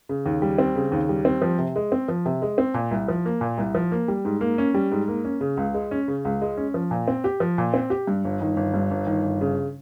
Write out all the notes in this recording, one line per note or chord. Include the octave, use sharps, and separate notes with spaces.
C#3
D#2
G3
C4
C#3
D#2
G3
C4
F3
C3
G#3
C4
F3
C3
G#3
C4
A#2
C2
F3
A#3
A#2
C2
F3
A#3
G3
G#2
A#3
C#4
G3
G#2
A#3
C#4
C#3
C#2
G#3
C#4
C#3
C#2
G#3
C#4
F3
A#2
C4
G4
F3
A#2
C4
G4
G2
G1
D#3
G1
G2
G1
D#3
G1
C#3